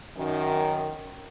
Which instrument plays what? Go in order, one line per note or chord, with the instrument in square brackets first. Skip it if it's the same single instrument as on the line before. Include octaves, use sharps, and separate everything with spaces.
[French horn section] F#2 D#3